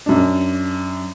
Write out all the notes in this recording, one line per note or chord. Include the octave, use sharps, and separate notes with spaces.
F#2 D4